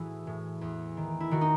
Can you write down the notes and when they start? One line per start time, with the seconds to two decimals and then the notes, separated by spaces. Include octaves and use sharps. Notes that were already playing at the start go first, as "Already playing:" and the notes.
Already playing: A2 E3 E4 F#4 G#4
0.27 A2
0.61 E2
0.97 D#3
1.20 E4
1.31 D#3 F#4
1.41 D#4